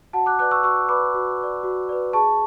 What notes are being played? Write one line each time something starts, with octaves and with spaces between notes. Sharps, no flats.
F#4 F#5 A5
D6 F#6
B4 D5 D6 F#6
C#6 E6
F#4 C#6 E6
B4 D5 B5 D6
F#4
B4
D5
F#4
B4 D5
G#4 A5 C#6